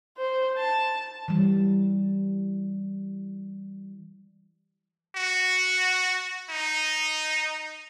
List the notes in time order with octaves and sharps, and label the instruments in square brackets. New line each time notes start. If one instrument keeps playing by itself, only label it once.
[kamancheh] C5
A5
[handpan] E3 G3
[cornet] F#4
D#4